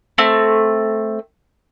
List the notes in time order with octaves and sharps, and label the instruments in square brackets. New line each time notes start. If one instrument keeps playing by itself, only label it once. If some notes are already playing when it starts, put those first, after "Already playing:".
[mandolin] A3 C4